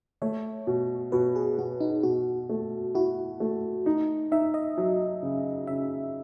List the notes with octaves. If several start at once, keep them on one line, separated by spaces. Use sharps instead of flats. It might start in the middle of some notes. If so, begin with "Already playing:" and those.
A3 C#5
B2
B2 B4
G#4
B2 F#4
D#4
B2 F#4
A3
E4 F#4
A3
D#4
D#4 E5
D#5
F#3
C#3
C#3 E5